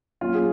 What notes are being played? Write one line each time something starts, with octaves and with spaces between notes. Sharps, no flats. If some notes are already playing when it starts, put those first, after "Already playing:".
A#2 F#3 C#4 F4
G#4